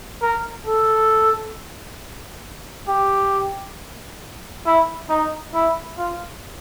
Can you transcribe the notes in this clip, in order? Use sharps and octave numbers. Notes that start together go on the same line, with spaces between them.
A#4
A4
G4
E4
D#4
E4
F4